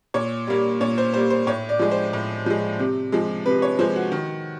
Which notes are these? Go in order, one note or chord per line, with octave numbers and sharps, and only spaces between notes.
A#2 C#5
G3 A#3
A#2 C#5
C5
G3 A#3 C5
C5
A2 C#5
D5
F3 G#3
C5
A2
F3 G#3
C3
F3 G#3
C3 B4
C#5
F3 G#3 C5
F#4
D#3